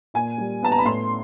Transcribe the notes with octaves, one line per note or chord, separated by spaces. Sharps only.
A#2 G#5
G3
B3 A5
A#5
B5
A2 C6